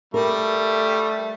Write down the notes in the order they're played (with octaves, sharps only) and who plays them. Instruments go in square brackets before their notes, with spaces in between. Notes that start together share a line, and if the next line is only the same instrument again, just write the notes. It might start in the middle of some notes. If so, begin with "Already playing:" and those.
[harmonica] G3 [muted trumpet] A3 [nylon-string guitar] A#4